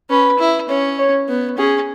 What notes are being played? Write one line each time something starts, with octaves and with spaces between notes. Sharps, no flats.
C#4 B4
E4
C#4 C#5
C#5
B3
C#4 G#4